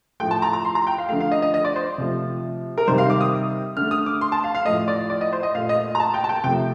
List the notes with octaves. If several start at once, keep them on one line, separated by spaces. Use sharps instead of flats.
A2 F3 A3 G5
A5
A#5
A#5
C6
A#5
G5
F5
D3 F3 A3 F5
F5
D#5
D#5
D#5
D5
C5
C3 F3 A3
A#4
C3 D#3 G3 C5
F5
D6
D#6
D3 A3 F6
D#6
D6
C6
A5
F5
F5
A2 F3 A3 D#5
D5
D5
D#5
C5
D#5
A#2 A3 F5
D#5
A#5
A5
G5
A5
G5
C3 F3 A3 G5